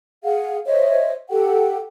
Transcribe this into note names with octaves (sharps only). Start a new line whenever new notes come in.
G#4 F5 F#5
C5 C#5 D#5 E5
G4 A4 F#5 G5